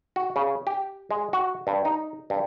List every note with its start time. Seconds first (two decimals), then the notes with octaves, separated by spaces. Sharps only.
0.16 F#4
0.36 C#3
0.67 G4
1.11 G#3
1.33 F#4
1.67 G2
1.85 D#4
2.30 G2